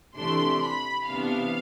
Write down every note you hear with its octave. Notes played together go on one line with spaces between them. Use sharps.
C3 E3 A3 D4 C6
B5
C3 E3 B3 D4 F5